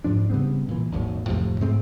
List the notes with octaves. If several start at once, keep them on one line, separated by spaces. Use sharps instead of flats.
G#2 F3 D4
C#3 G3 B3 C4
A#2 E3
G#1 D#2 D3 F#3
F2 A2 C3 F3
G#2 G#3 A3 C4